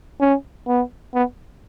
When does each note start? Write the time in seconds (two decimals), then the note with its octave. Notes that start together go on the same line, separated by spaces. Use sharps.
0.20 C#4
0.67 B3
1.14 B3